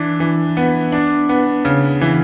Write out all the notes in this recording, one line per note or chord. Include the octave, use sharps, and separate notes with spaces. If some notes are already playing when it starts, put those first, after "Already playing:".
Already playing: E3 D4
E3
B3
D4
B3
C#3
E3